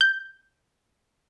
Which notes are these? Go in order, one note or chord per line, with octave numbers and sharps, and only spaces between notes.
G6